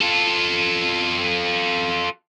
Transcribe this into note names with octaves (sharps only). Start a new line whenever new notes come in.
F4 A4